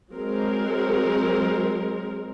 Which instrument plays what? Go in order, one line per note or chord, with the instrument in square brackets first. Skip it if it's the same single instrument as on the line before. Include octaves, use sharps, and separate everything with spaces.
[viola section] F#3 G#3 C4 A#4